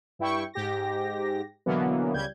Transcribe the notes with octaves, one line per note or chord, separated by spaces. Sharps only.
G2 E4 G5 C#6
G#2 G4 A#6
B2 D3 E3 F#3 A#3 B3
C#2 G3 G6 G#6